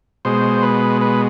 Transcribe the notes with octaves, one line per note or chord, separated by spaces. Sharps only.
B2 G#3 C5
B4
B4